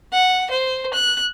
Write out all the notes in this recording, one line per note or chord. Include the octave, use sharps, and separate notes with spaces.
F#5
C5
F#6